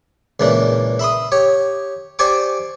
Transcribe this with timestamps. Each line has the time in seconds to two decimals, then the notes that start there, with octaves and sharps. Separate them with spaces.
0.40 C#2 A#2 E3 D4
0.99 E5 B5 C6 D#6
1.32 G4 C#5
2.19 G4 C5 D5 G#5 C#6 D6